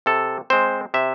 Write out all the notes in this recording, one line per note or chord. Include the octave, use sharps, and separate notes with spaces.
C3 A4
G#3 C4 C5
C3 E5